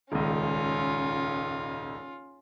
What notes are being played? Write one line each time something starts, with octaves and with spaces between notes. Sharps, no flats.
D#1 G#1 C#2 C#4 F4